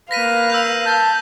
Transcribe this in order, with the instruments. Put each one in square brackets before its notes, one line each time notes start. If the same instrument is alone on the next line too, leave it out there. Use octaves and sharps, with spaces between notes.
[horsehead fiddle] A#3 F5 [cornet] B4 [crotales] A#6 B6 D#7
[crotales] E6 G6 F7
[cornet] A5 [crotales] E6 A#6 [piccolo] G6